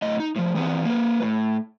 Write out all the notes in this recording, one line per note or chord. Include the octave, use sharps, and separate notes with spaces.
A2 D#5
D#4
A2 F3
E3 B3 C4
A#3 B4
A2